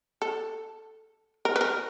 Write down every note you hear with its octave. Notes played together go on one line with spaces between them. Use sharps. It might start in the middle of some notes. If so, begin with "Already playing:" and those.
A4
A#4
B4
A#4